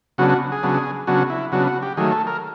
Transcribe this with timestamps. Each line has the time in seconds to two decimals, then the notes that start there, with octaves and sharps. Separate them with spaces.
0.18 C#3 F#3 B3 D4 F#4
0.30 F#4
0.52 G#4
0.63 C#3 F#3 B3 D4
1.07 C#3 F#3 B3 D4 F#4
1.30 E4
1.52 C#3 F#3 B3 D4 F#4
1.67 F#4
1.83 G4
1.97 D#3 F#3 A3 G#4
2.12 A4
2.27 A#4